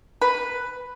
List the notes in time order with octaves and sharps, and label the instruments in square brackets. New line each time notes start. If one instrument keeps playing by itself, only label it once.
[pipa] B4